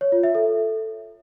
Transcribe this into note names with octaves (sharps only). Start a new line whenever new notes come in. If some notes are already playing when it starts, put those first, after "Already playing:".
C#5
F4
E5
A4